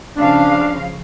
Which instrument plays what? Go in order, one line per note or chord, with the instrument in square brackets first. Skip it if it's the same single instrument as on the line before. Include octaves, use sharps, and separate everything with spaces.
[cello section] C#3 F3 F5 [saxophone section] D4